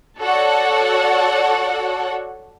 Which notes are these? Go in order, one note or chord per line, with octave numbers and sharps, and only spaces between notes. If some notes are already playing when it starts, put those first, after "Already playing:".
F#4 A4 C#5 D5 F#5